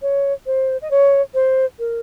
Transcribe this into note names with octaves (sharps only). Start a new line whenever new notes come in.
C#5
C5
D#5
C#5
C5
A#4